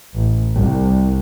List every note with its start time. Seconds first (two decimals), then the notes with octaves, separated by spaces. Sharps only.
0.15 A1
0.57 C2